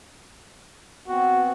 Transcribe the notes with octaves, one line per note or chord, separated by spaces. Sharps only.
B3 C4 F#4